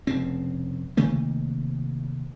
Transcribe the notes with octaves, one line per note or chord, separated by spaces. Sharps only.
F1 C#3 C4
C3 D#3 A3 A#3